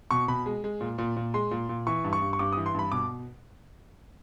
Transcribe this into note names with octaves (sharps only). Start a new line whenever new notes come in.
B2 C#6
B2 B5
G#3
G#3
A#2
A#2
A#2
G#3 C6
A#2
A#2
E3 C#6
G2
C#6
G2
C#6
G2 D6
D#6
E3
C6
G2 B5
B2 D6